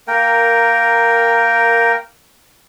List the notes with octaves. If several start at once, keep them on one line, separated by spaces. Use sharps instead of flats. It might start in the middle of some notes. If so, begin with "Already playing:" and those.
A#3 A#4 G5